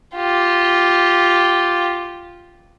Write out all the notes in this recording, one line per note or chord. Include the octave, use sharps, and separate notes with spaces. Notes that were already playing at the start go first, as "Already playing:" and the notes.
F4 G4